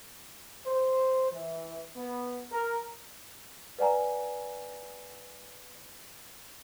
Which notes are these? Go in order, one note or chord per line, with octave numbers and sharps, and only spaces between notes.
C5
E3
B3
A#4
B4 D5 F#5 G#5 A#5